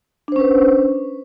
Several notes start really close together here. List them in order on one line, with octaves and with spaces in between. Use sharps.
D4 C5 C#4 B4